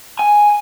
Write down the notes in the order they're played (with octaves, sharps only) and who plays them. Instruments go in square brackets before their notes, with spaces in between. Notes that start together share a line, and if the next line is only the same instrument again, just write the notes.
[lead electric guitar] G#5